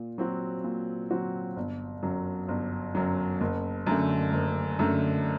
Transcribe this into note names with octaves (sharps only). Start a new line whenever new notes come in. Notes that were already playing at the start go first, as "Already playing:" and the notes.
Already playing: A#2
F#3 C4 F#4
A#2
F#3 C4 F#4
G1
F#2 F#3
G1
F#2 F#3
F#1
F#2 D3 A3
F#1
F#2 D3 A3